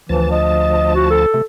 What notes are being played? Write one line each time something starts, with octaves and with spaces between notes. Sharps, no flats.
D2 E3 F3 A5
D#5
F#4
A4
C3 A3